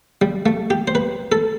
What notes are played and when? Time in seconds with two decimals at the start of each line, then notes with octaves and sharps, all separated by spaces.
0.22 G3
0.46 A3
0.70 G4
0.88 C5
0.95 B4
1.32 A4